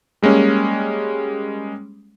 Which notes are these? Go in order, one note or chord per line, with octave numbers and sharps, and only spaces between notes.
G3 G#3 A#3 C#4